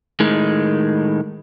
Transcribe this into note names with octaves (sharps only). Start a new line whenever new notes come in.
A2 D#3 G#3